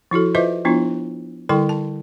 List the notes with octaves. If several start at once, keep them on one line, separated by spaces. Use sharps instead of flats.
F3 E4 F#4 A4
F4 B4 C5 D#5 E5 D6
F3 B3 D4 E4 F4
D3 G3 E4 A4 G5 C#6
A5